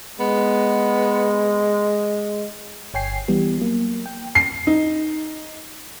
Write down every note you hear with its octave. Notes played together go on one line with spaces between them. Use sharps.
G#3 B3
G1 C#5 G5 G#5 C7
E3 G3 B3
F#3 A#3
G5
C7
D#4